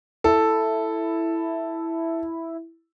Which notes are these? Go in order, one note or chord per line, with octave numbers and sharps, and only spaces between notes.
E4 A4